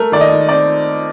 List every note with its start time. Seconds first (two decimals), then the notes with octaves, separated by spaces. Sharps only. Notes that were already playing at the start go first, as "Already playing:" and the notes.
Already playing: A3 A#4
0.12 D#2 D5
0.21 D#5
0.31 D#2
0.49 C4 D5